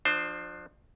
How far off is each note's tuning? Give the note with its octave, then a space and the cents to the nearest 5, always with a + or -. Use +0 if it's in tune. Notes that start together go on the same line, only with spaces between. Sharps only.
F3 +30 D4 +35 C5 +0